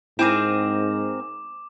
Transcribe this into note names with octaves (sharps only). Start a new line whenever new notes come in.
G#2 C4 E4 G#4 A#4 D6 E7